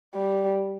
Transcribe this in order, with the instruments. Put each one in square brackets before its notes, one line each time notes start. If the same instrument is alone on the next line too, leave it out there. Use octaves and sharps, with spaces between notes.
[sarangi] G3